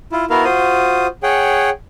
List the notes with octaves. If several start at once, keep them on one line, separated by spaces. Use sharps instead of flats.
E4 F4
B3 E4 F#4 A#4 F5
F4 F#4 C5 D#6
G#4 C#5 F#5 G5